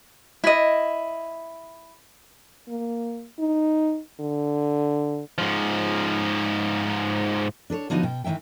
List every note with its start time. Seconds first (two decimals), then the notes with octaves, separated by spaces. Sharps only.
0.44 E4 D#5
2.69 A#3
3.40 D#4
4.20 D3
5.38 G#2 F3
7.70 D4 A4 B4 C#5
7.90 D3 F3 B3 D#4 F#4 C#5
8.03 B2 G5
8.24 D#3 E3 F#3 E5 G5